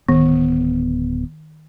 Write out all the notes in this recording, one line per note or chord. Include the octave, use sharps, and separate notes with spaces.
D1 D#3 B3